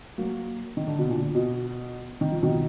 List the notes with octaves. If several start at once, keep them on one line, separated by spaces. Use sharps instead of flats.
F#3 A#3
D#3
D3
B2
A#2 D3
B2
D#3
F3
B2 D#3